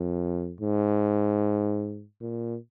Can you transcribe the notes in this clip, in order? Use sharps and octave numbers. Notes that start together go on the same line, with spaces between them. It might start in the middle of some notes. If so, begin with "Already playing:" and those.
Already playing: F2
G#2
A#2